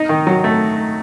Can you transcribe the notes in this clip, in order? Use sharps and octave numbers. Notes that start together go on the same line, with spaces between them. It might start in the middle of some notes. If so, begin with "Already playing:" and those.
Already playing: D#4
D#3
F#3
A3